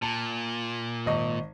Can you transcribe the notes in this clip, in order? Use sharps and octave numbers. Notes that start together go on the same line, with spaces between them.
A#2 A5
G#1 D#5 C#6